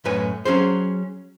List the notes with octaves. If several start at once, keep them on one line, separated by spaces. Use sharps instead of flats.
F#2 A2 B4 C#5 G#5
F#3 C#4 G#4 C5